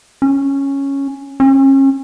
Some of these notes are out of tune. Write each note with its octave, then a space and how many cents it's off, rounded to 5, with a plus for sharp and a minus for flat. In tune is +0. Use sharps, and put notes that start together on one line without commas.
C#4 -5
C#4 -35